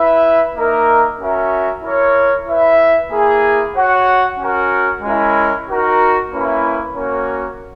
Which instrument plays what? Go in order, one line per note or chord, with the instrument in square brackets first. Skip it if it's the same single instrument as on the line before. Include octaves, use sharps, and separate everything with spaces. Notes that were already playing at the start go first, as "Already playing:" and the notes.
Already playing: [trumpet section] E4 B4 E5
A#3 D#4 A#4 E5
C#4 F#4 A#4 E5
E4 A#4 C#5
E4 B4 E5
A#3 E4 G#4
F#4 C#5 F#5
C#4 F#4 A#4
G#3 C#4 E4 A#4
D#4 F#4 A#4
A#3 C#4 E4 B4
A#3 C#4 F#4 A#4 C#5